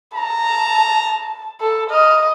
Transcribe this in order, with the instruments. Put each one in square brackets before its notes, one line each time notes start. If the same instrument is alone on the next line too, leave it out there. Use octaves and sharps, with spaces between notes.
[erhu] A5 [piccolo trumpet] A#5
[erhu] A4
[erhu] D#5 [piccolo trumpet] F6